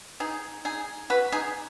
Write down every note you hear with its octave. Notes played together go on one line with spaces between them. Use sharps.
D#4 G#4
D#4 G#4
F#4 B4
D#4 G#4